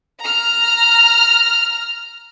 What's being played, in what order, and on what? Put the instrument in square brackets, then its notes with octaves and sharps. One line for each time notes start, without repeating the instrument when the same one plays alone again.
[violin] A#5 F6